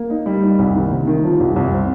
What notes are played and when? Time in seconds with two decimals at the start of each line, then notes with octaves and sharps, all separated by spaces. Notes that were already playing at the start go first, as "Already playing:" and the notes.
Already playing: A#3
0.10 D#4
0.26 G3
0.43 D#4
0.59 C2
0.75 D#3
0.92 C3
1.07 D#3
1.24 F3
1.40 C2
1.56 C2
1.72 C4